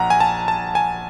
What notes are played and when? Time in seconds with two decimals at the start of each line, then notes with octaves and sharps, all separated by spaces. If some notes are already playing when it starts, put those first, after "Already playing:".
Already playing: A#1 F#5 A#5
0.10 G#5
0.20 A5
0.48 A5
0.75 G#5